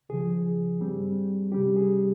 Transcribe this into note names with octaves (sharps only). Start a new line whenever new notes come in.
C#2 C#3 F3 G#4
G2 G3 C4
C3 G3 C#4 G4
G#4